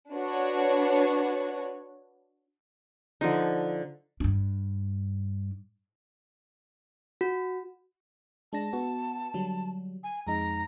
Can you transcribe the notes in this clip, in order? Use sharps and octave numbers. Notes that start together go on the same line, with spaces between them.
D4 F#4 B4 C#5
D3 F3 D#4
G2 D4
F#4
G#3 D4 A5 A#6
B3 F#4
D3 F#3 G3
G#5
F2 G#3 D#4 A#5